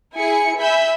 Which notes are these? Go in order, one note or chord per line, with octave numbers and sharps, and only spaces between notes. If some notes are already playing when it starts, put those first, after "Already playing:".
E4 G#4 G#5 C#7
E5 G#5 B5 E6 G6